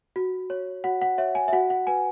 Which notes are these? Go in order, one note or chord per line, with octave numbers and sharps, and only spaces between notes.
F#4
C#5
F#4 F#5
F#5
C#5 E5
G#5
E5
F#4 F#5
F#5
B4 G#5